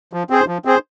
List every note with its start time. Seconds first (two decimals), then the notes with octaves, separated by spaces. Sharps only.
0.13 F3
0.30 C4 G#4 C5
0.48 F3
0.65 C4 G#4 C5